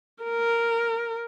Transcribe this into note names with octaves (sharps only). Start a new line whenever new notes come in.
A#4